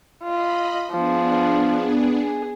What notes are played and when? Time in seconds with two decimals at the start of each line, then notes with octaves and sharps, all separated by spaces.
0.23 F4 D#5 B5
0.91 F3 B3 D4 G#4
2.22 G#4